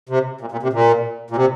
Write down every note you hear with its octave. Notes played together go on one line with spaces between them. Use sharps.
C3
A#2
A#2
C3
A#2
A#2
C3